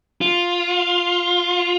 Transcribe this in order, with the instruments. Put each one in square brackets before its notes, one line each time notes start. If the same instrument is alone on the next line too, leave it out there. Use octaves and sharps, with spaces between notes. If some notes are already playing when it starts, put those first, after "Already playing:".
[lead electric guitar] F4